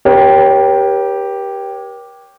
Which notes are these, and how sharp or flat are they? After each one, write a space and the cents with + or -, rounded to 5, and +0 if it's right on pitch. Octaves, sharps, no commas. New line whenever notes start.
G4 +0 A#4 +40 C#5 -15